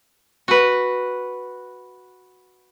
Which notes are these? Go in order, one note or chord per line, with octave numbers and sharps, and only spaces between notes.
F#4 B4